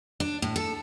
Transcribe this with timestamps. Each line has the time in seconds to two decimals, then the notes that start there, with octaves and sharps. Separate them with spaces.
0.20 D4
0.42 A2
0.56 A4